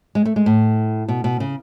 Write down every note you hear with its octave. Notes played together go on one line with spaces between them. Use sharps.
G#3
A3
G#3
A2
B2
B2
C#3